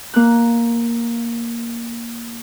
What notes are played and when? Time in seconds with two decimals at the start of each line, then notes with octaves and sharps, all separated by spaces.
0.14 A#3 F#6